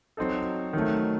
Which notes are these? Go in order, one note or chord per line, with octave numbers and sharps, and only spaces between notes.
F#3 C4 D#4 A4
D#3 F#3 A3